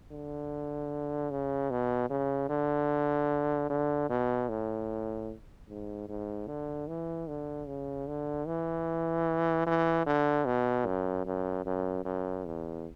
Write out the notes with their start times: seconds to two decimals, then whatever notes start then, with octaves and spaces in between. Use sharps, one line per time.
0.11 D3
1.31 C#3
1.70 B2
2.10 C#3
2.49 D3
3.69 D3
4.09 B2
4.49 A2
5.69 G#2
6.08 G#2
6.47 D3
6.88 E3
7.27 D3
7.67 C#3
8.08 D3
8.47 E3
9.66 E3
10.06 D3
10.45 B2
10.86 F#2
11.25 F#2
11.65 F#2
12.05 F#2
12.45 E2